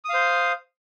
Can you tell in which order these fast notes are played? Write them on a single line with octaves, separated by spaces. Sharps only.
D#6 F5 C5